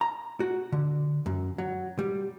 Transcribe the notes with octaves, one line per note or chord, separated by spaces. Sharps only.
A#5
F#4
D3
F#2
F#3
G3